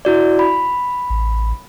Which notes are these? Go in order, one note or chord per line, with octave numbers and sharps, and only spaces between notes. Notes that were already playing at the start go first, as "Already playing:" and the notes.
E4 F#4 D5
B5
A1